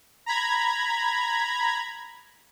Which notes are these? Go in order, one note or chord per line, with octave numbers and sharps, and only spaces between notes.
A#5 B5 G#6